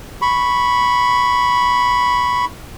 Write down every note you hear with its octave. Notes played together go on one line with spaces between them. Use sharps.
B5 C#6